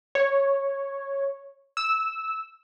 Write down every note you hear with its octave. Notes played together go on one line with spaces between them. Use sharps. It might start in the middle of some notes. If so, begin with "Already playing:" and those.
C#5
E6